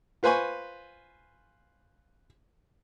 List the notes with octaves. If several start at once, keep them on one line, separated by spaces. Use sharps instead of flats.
F4 B4 C5 G#5 B5 C#6